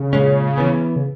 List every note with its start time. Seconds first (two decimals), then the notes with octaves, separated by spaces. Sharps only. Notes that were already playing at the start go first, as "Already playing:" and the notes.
Already playing: C#3
0.13 A#2 G#3 C#4
0.58 E3 B3
0.96 C#3